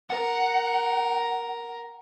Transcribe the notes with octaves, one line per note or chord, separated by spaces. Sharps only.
A#4 F#5